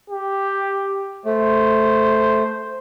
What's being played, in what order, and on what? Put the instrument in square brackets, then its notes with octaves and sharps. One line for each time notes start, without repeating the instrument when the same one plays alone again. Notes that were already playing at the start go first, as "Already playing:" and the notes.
[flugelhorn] G4
[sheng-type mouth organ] A3 [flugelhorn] C5